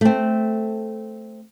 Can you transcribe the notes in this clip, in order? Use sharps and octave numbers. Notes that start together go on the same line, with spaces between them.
A3 C4